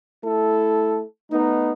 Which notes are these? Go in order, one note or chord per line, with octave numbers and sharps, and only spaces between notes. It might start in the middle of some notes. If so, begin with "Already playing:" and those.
A3 E4 A4
A3 B3 D#4